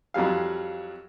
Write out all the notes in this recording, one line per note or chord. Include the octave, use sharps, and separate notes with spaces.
F2 F#3 G3 F5